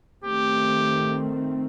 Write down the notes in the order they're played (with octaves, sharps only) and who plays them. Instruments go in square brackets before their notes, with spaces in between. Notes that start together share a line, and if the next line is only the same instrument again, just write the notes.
[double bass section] D#3 A3 C4 [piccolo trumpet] G4